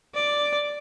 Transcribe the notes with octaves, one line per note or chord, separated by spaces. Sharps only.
D5